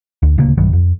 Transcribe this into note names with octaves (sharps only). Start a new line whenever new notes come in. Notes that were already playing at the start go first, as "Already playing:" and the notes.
D2
D#1 D2 C#3 A#3
B1 G2 D#3 F#3
F2